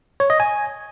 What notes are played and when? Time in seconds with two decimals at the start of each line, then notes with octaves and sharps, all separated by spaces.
0.20 C#5
0.30 D#5
0.40 G#5